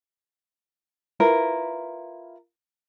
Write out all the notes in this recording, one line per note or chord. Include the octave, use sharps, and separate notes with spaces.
E4 F4 A#4 B4